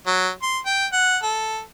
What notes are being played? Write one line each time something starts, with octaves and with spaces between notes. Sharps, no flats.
F#3
C6
G5
F#5
A4